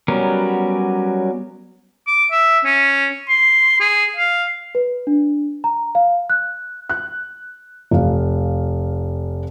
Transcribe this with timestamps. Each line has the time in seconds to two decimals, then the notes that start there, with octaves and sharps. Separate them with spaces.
0.08 F#3 G3 B3 C#4 A#4
2.07 D6
2.31 E5
2.65 C#4
3.29 C6
3.80 G#4
4.17 F5
4.75 B4
5.07 D4
5.64 A#5
5.95 F5
6.30 F#6
6.89 F#6
7.91 F1 F5